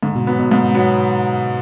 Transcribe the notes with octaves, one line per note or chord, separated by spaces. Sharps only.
G#2 D3
B2
F#3 B3
B2
G#2
F#3 B3